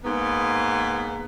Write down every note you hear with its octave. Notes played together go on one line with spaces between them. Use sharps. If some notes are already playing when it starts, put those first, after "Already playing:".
G#2 A#3 B3